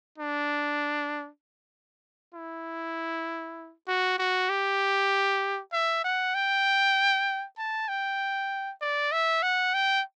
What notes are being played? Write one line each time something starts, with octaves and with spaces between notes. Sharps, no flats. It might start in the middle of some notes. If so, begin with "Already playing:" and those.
D4
E4
F#4
F#4
G4
E5
F#5
G5
A5
G5
D5
E5
F#5
G5